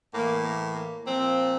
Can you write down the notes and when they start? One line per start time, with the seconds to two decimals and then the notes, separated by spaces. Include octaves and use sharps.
0.14 A2 E3 A#3
0.45 A#3
0.76 A#3
1.06 A#2 F3 C4